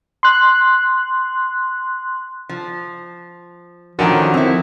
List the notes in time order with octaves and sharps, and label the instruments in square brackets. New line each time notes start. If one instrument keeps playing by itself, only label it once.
[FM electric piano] C6 F#6
[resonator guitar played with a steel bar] F3
[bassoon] F#2 [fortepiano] D3 D#3 [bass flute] F3
[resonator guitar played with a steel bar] C4 E4